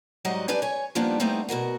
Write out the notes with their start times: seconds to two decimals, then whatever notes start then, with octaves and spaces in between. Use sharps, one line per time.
0.25 G#2 F#3 G3 D#5 F#5
0.48 D4 G4 B4 D5 G#5
0.62 C#5 G#5
0.95 F3 G3 A#3 B3 D4 D#4
1.20 G3 A3 B3 C4 D#4
1.49 B2 F#4 A#4 F#5